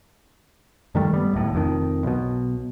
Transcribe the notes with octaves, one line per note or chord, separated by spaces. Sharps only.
G2 D#3 G3 A3
G3 B3
D1 D#2 A2
F1 F2 G#2 D#3
B1 B2